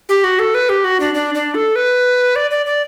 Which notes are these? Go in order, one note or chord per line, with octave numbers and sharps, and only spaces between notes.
G4
F#4
A4
B4
G4
F#4
D4
D4
D4
A4
B4
D5
D5
D5